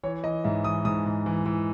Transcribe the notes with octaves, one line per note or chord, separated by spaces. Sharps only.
E3 C#5
E3 D#5
G#2 E5
E3 D#6
G#2 D#6
G#2
E3
E3